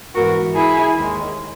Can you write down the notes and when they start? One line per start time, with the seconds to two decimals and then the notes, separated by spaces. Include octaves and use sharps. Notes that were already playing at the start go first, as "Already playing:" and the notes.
0.14 G#2 E3 B3 F#4 A#4
0.55 E4 G#4
0.95 D#2 D#3 G#3